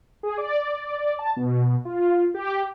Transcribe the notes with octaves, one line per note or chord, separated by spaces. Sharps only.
G#4
D5
A5
B2
F4
G4